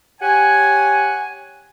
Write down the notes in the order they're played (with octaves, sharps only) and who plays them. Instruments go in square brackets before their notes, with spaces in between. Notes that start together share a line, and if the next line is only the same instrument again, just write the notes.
[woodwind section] G4 C#5 F#5 G#5